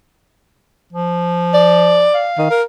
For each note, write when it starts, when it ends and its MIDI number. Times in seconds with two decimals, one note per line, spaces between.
0.93 2.08 53
1.54 2.29 74
2.15 2.60 77
2.38 2.46 51
2.51 2.63 70